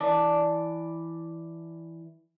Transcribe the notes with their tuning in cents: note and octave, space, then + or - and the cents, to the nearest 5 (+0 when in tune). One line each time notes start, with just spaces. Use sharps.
E3 +0 D5 +0 A5 +0